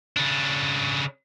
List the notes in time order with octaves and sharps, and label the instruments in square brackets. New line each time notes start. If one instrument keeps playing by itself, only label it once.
[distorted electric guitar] C#3 D4